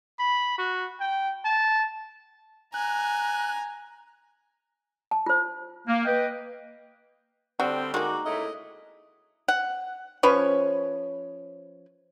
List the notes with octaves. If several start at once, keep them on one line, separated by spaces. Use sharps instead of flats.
B5
F#4
G5
A5
G#5 A#5 F#6
A5
F4 C5
A#3
B4 D#5 G5
D3 G3 C4 F#4
G#3 A#3 D#4 F#4 A#4 D6
C#3 A3 E4 D#5
F#5
F3 C#4 B4 C#5